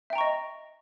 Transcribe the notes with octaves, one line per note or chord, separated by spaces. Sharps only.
D#5 E5 G5 A#5 C#6